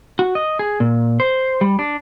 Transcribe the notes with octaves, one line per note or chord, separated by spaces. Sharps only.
F#4
D#5
G#4
A#2
C5
G3
D4